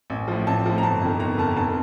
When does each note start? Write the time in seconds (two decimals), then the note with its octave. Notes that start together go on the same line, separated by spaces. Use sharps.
0.10 A1
0.28 A2 F3
0.47 A1 A5
0.66 A2 F3
0.78 A#5
0.83 G1 A5
1.01 F2 D#3
1.20 G1 A#5
1.38 F2 D#3 A5
1.57 F1 A5